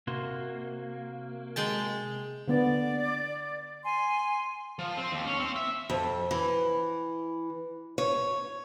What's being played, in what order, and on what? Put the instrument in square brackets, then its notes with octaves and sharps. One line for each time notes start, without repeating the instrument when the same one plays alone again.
[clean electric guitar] C3 F#4 C6 [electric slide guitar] A#3
[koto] G#3 G5 A5
[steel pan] D3 B3 [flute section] D5
[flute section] G#5 C6
[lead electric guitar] F3
C4
D#2
C#4
C4
E5
[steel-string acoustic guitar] F2
E3
C#5